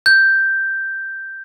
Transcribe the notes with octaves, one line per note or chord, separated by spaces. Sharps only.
G6